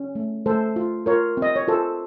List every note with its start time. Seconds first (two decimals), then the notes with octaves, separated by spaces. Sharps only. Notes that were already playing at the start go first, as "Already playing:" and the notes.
Already playing: C#4
0.15 A3
0.46 A3 A4 C5
0.76 F4
1.06 F4 A#4 C#5
1.37 C4
1.42 D#5
1.56 C#5
1.68 F4 A4 C5